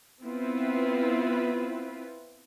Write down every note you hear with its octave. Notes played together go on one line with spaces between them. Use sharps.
B3 C4 E4 F4 B4